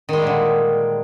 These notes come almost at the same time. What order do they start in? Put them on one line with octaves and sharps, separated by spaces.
D#3 G#3 G3 A#2 D3